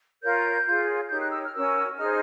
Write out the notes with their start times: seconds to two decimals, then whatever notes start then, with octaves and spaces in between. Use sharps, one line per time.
0.23 F4 A#4 C#5 G6
0.66 F4 G#4 C#5
1.10 D#4 G4 A#4 C#5 G6
1.20 F#6
1.31 E6
1.43 F6
1.53 C#4 F#4 A#4 E6
1.97 D#4 G#4 C5 F6